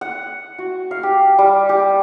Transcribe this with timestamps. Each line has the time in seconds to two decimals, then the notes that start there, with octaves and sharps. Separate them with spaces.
0.01 F#5
0.58 F#4
0.91 F5
1.03 G4
1.38 G3
1.69 G4